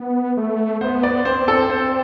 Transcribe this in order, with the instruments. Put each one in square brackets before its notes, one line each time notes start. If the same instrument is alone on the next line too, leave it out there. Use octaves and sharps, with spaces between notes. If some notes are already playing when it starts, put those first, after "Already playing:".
Already playing: [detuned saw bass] B3
A3
[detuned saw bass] B3 [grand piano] C5
[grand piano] D5
[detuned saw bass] C4 [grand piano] C5
[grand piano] A4
[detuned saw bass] C4 [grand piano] C5